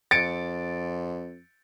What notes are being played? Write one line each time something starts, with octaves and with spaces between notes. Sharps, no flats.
F2 A6 C#7 D7